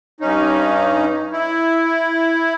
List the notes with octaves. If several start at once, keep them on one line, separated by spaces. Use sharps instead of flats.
G2 C#4 D#4
E4